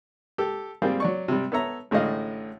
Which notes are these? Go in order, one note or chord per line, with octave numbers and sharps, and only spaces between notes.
G4 A4
G3 A#3 C4 F4 G#4
F#3 D5 C#6
C3 G3
B3 A4 C#5 E5 A#5
A1 A2 D3 G#3 D#5 F5